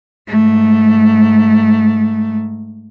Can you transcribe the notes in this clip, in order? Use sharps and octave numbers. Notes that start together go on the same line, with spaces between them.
G#2 A3